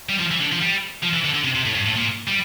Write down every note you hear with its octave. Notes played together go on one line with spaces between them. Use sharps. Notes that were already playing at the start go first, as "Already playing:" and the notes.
G3
F3
E3
D3
F3
G3
F3
E3
D3
D3
C3
C3
A2
G2
A2
A#2
G3